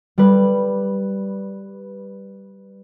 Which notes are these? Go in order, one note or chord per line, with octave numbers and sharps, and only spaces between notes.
G3 B4